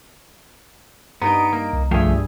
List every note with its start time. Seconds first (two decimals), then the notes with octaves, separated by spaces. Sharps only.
1.22 G2 B3 D#4 A#4 D#5 A#5 D7
1.53 A#3
1.73 C2
1.91 A#1 G2 F3 A3 G#4 E5 F5 G5